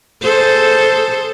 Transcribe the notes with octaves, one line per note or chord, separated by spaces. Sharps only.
G#4 A4 C5